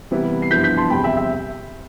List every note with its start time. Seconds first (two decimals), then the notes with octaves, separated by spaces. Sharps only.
0.11 C3 E3 G3 B3 E4
0.42 C7
0.51 G2 F3 B3 E4 G6 B6
0.64 G6 B6
0.77 A5 C6
0.90 E2 C3 G3 G5 B5
1.04 E5 G5
1.17 E5